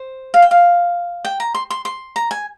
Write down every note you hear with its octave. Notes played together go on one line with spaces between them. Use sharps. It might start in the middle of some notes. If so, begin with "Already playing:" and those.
Already playing: C5
F5
G5
F5
G5
A#5
C6
C6
C6
A#5
G#5